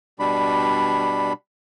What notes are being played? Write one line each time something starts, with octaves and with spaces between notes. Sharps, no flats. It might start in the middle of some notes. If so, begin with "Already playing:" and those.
B2 G3 D4 B5